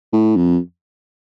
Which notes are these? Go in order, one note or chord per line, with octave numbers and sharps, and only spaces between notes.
A2
F2